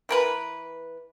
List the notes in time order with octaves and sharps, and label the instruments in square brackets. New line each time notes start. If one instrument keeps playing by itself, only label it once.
[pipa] E3 A#4 B4